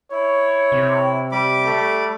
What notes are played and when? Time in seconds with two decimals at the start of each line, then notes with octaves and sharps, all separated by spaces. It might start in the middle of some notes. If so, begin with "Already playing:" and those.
0.12 E4 C#5
0.72 C3
1.32 G3 B5 D6
1.64 A3